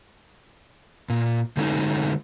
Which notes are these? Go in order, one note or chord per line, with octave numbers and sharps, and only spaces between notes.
A#2
D3 G#3 A3 C#4 D#4 F#4